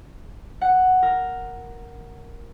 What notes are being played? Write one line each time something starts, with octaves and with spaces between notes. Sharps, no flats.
F#5
A#4